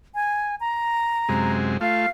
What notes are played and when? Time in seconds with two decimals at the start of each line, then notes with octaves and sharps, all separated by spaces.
0.15 G#5
0.60 A#5
1.29 F#2 C3 G#3
1.81 A3 F4 F5